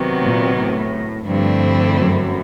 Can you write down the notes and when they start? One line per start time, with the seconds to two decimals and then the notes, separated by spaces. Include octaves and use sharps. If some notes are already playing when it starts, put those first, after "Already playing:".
Already playing: C3 D#3 F#3 B3
0.21 A#2
0.56 A2
1.25 G2 D3 F3 A3 C4 E4
1.94 F#2